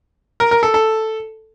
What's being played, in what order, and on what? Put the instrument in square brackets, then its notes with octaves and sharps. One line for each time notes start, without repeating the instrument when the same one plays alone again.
[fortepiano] A#4
A#4
A4
A4